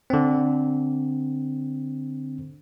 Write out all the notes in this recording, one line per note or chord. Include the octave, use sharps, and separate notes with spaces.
D3 C4